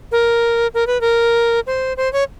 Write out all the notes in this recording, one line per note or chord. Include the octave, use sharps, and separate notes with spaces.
A#4
A#4
B4
A#4
C5
C5
C#5